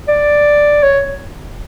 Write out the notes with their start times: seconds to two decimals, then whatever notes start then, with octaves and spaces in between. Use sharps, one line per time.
0.08 D5
0.83 C#5